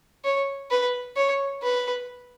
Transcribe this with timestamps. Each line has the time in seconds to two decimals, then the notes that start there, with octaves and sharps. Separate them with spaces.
0.25 C#5
0.71 B4
1.16 C#5
1.62 B4